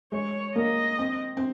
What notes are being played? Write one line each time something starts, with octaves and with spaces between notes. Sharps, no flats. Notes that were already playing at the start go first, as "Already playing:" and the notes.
G#3 C#5
A#3 D#5
C4
C4